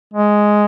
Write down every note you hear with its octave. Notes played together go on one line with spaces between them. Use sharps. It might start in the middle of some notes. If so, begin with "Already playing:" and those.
G#3